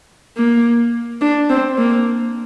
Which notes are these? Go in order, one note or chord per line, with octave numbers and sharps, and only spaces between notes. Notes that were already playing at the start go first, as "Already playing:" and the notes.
A#3
D4
C4
A#3